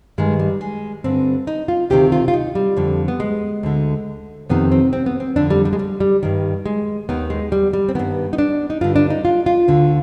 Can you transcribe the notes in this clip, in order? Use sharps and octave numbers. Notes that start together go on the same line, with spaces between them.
G2 D#3 G#3
G3
G#3
G2 D3 C4
D#4
F4
D2 C3 D#3 G4
F4
F4
D#4
G3
F2 D3
B3
G#3
D2 D3
F2 C3 D#3 B3
C4
C4
B3
C4
F2 D3 D4
G3
G3
G#3
G3
G3
G2 D#3
G#3
D#2 D#3 B3
G#3
G3
G3
C4
G2 D#3 B3
D#4
D4
D#4
G2 D3 F4
D4
D#4
F4
F4
D2 D3